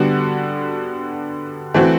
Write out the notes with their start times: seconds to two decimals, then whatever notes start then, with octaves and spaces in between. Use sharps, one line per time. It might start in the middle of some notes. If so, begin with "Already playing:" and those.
Already playing: D3 G3 B3 F#4
1.74 E3 A3 C4 F#4